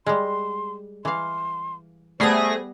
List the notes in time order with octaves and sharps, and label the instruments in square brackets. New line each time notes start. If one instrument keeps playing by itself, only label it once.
[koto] G3 G#3 [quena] C6
[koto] E3 F5 [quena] C6
[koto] G3 B3 [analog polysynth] A3 G#4 A#6 [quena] C5